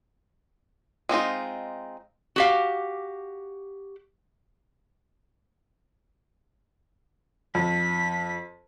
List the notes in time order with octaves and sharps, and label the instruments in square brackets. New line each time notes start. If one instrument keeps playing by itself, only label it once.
[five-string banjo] G#3 C4 D#4 F4
[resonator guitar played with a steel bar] F#4 G4 F5
[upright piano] F2 [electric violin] B6